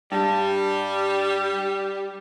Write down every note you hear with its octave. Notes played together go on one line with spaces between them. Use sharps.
G2 G3